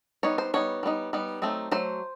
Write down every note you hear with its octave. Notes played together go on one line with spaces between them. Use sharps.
G3 B3 D#4 C#5
C5
G3 B3 D#4 C#5
G3 B3 D#4
G3 B3 D#4
F#3 A3 C4 D#4
F#3 A3 C5